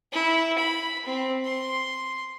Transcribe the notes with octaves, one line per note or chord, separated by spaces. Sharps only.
E4
B5
C4
C6